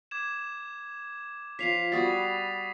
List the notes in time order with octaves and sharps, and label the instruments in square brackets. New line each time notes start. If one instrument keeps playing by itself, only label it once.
[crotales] D6 G#6 E7
[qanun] F3 F4 C#5 [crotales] B6 C7 F7
[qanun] G3 B3 F#4 [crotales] C#6 D#6 A6